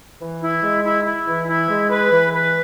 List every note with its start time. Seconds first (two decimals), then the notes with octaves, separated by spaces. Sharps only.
0.21 E3
0.41 E4
0.63 G#3
0.84 E4
1.05 E4
1.26 E3
1.48 E4
1.69 G#3
1.90 B4
2.11 E3
2.33 B4